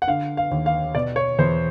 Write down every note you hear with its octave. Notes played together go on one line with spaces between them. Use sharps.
F#5
D3 F5
F5
D#2
F5
B2 D5
C#5
E2 C5